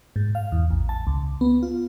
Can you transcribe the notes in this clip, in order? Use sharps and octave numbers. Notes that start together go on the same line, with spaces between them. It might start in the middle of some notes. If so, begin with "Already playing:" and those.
G#2
F5
E2
A1
A5
C#2
B3
F4